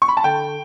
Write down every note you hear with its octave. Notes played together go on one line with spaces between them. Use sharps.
C#6
B5
A5
D3 G5